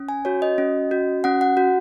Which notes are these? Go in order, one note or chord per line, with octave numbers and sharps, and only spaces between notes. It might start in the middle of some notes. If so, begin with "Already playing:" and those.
Already playing: C#4
G#5
F#4 C#5
D#5
C#4
F#4
C#4 F#5
F#5
F#4